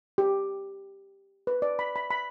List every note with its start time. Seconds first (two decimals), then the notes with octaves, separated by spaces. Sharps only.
0.18 G4
1.47 B4
1.62 D5
1.79 B5
1.96 B5
2.11 B5